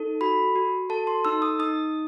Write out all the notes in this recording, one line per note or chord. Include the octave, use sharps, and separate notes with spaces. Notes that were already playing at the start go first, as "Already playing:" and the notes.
Already playing: D#4 A4
F#4 B5
F#4
A4 A5
C6
D#4 E6
D#6
D#4 D#6